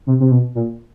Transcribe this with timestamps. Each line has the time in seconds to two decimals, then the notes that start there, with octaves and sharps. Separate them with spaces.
0.07 C3
0.20 C3
0.31 B2
0.55 A#2